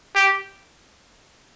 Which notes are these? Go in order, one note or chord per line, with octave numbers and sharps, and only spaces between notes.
G4